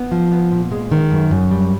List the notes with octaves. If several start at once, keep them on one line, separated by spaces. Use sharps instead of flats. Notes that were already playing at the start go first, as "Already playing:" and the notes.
Already playing: B3
F3
B3
A#2
G#3
D#3
F#2
F#2
G3